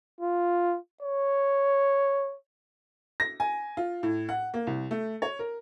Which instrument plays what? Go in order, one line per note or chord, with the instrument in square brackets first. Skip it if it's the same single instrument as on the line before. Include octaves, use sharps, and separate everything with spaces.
[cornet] F4
C#5
[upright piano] A#6
G#5
F4
A2
F#5
A#3
C2
A3
C#5
A#4